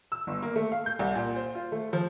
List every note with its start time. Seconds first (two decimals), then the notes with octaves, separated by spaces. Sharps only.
0.12 E6
0.27 G1
0.42 A#3
0.56 A3
0.72 F5
0.86 G6
0.99 C2
1.15 A#2
1.36 C5
1.55 F4
1.72 A3
1.93 F3